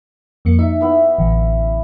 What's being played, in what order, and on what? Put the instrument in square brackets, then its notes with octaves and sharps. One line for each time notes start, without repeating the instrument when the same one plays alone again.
[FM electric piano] F2 A#3 C#7
[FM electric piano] D#4 [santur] E5
[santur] B3 E4
[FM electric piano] A1 D3